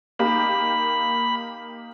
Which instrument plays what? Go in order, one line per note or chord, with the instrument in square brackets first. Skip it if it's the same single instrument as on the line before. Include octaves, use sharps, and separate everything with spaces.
[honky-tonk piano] A#3 D#4 G4 [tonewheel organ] B5